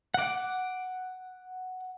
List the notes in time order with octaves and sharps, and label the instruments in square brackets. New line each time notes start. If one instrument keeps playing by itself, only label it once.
[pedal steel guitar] F#5 D6